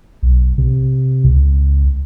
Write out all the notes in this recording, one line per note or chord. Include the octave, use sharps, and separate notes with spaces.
B1
C3
C#2